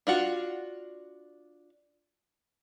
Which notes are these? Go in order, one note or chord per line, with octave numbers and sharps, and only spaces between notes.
D4 F4 F#4